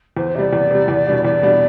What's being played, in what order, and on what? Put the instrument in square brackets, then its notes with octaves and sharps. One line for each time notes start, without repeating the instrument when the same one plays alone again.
[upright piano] E2 [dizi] C5
[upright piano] C3 G3 [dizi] D5 E5
[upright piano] E2
C3 G3
E2
B2 G3 D4
[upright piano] E2 [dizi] D5
[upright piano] B2 G3 D4